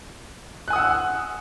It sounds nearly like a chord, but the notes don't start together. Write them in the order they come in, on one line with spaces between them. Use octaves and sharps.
F#6 G#5 D#6 F#5 E6